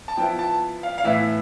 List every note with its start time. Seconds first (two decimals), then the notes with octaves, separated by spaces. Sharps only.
0.08 A5
0.17 F3 B3 E4 G5
0.39 A5
0.83 F5
0.98 F5
1.04 A2 E3 B3 E4 E5